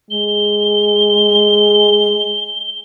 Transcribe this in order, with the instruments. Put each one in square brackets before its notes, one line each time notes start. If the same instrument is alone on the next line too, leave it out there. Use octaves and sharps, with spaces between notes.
[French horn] G#3 [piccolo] G7